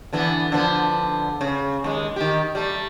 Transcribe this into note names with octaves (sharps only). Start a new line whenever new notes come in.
D3 E3 B3
D3 F3 B3
C#3
D#2 G#3
D#3 G4
G3 A3